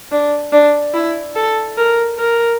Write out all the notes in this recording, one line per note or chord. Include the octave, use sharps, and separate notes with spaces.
D4
D4
E4
A4
A#4
A#4